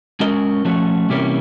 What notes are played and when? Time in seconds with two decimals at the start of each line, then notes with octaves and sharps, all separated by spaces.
0.20 G#3 C#4 F#4 A#4 D#5
0.65 F3 A3 C#4 F#4
1.09 C3 E3 G3 A#3 C#4